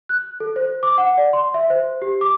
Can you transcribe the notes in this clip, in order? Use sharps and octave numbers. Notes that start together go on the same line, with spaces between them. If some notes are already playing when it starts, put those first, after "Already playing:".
F#6
A4
C5
D6
F#5
D5
C6
E5
C5
G4
D6